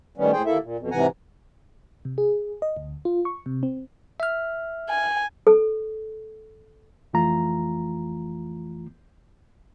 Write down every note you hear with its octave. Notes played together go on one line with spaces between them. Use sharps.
A2 D#3 G3 B3 C#4
A2 G#4 C5 G5
D#2 A#3 E4 A4 E5
A#2
F2 B2
G#2 C3 E3 F#5 G#5 A#5
C3
G#4
D#5
D2
F4
C#6
C3
C4
E5 F6
G#5
A4
F2 E3 A3 F4 A#5